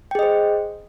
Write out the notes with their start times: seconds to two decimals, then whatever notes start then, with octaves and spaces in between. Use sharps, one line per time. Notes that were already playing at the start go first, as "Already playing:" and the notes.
0.11 G5
0.15 G#4
0.19 D#5
0.23 C5